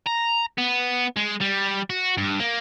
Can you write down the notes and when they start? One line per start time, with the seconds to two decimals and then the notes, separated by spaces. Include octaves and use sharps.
0.07 A#5
0.58 B3
1.17 G#3
1.41 G3
1.90 F#4
2.17 G2
2.39 A#3